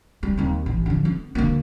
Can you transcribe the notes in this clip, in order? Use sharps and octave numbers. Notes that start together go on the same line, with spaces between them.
G3
D#2 C4
A1
D3 F3
B3
D2 A#3